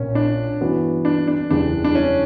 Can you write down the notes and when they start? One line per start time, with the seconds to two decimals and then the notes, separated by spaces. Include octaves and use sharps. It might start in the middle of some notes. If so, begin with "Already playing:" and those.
Already playing: A#1 A#2 A#3 C#4
0.15 D4
0.61 G2 E3 B3 F#4
1.05 D4
1.28 D4
1.50 F#1 E2 C#3 G3 D4
1.84 D4
1.95 C#4